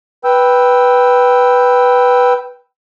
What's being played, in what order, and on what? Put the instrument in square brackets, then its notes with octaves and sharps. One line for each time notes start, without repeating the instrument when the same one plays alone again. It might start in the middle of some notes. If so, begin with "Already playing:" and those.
[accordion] B4 G5 E6